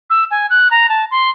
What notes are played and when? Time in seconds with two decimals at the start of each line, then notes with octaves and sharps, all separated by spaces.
0.10 E6
0.31 G#5
0.50 F#6
0.71 A#5
0.89 A5
1.11 C6